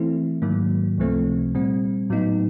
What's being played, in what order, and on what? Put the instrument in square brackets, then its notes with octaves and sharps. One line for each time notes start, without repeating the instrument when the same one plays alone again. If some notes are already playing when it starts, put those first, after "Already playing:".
Already playing: [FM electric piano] E3 A3 C4 E4
G#2 D#3 F#3 A#3
C#2 C3 F3 A3 C4
A#2 G3 C4
A2 F#3 B3 D#4